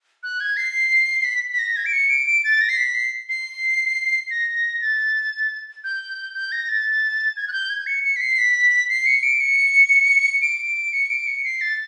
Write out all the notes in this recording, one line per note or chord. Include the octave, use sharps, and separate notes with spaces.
F#6
G#6
C7
C7
B6
B6
A#6
G#6
D7
C#7
D7
D7
A6
A#6
C7
B6
C7
C7
A#6
A6
G6
G6
A#6
A6
G#6
F#6
G6
G#6
C#7
C#7
B6
C7
B6
C7
C#7
D7
C#7
D7
C#7
D7
C#7
C7
A6